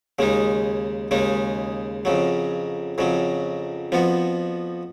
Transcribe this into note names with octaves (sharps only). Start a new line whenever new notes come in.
D#2 C#3 G#3 D#4
D#2 C#3 G#3 D#4
F2 C#3 F#3
F2 C#3 F#3
F2 F3 B3 F#4